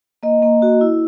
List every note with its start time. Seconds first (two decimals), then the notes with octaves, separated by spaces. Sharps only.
0.23 A#3 D#5
0.42 A#3
0.62 F#4
0.81 E4